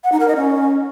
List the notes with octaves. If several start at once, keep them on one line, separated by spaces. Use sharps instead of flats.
F#5
D#4
A#4
D#5
C#4